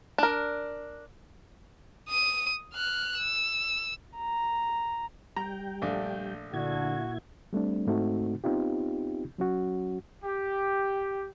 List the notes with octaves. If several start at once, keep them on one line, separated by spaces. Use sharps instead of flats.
D4 A#4
D#6 D#7
F6 F#6
E6
A#5
G3 G5 A#5
A#1 A3 D4
A#2 D3 E4 F#4 G#6
G3 A3 C4 D4
G#2 A3 C4 D#4 F#4
B3 C4 D#4 F4 G4
F#3 C#4 F#4
G4